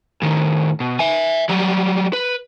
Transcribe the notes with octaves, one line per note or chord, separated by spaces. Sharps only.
A2 D#3
B2
E5 G#5
F#3 G3
B4